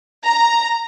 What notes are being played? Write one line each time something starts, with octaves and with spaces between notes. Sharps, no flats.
A#5